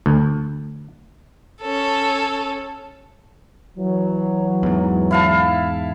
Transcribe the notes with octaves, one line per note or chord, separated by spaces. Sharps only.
D2
C#4 A4
E3 F#3
E2 G#2
E4 F5 A5